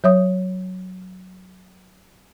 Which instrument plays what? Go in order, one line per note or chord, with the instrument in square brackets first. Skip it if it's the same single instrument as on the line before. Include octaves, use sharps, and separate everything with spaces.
[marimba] F#3 C#5 E5 D#6